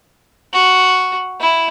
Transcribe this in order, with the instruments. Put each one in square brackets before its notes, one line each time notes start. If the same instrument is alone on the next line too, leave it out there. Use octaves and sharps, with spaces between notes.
[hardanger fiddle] F#4
E4